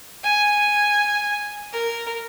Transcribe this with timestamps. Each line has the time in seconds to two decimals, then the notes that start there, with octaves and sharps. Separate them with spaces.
0.23 G#5
1.72 A#4